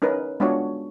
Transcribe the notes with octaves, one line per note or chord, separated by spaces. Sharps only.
C#4 D#4 A#4 B4
G#3 B3 D4 F4 F#4 C#5